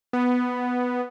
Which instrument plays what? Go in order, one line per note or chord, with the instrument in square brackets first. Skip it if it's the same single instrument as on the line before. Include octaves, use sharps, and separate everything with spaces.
[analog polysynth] B3